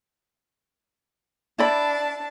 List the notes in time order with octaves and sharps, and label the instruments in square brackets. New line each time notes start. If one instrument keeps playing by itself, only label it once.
[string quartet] D4 A5 [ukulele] E4 D5 B5